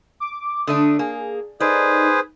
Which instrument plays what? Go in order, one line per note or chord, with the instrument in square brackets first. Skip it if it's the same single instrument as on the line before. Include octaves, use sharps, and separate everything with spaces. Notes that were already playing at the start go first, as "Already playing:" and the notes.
[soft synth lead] D6
[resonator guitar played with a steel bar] D3 A3 D4 [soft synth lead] D#6
[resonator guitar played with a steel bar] A#3 [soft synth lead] G#4
[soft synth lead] D#4 [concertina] G#4 B4 C5 [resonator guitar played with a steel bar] A4 D5